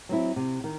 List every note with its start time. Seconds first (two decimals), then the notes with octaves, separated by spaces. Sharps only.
0.09 F#3 C4 E4
0.36 C3
0.64 D#3